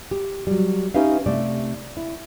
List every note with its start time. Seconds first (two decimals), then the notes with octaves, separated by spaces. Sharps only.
0.11 G4
0.47 F#3 G3
0.94 C#4 D#4 G4 B4 E5 F5
1.26 C3 A3 D5
1.97 E4